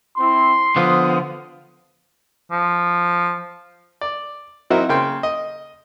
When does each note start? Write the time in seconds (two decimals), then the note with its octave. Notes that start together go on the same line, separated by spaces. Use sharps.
0.17 C4 E4 C6
0.76 D3 F3 B3 D#6
2.51 F3
4.01 D5
4.70 F#3 C4 D#4 E4 F#4 A#4
4.89 C#3 A#3 G5 C6
5.23 D#5